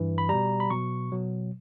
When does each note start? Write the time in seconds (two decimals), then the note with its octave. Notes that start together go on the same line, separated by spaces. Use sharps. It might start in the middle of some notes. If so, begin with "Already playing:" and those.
Already playing: G2 E3
0.18 B5
0.29 B2 G3 A#5
0.60 B5
0.70 B2 F#3 C#6
1.12 B2 F#3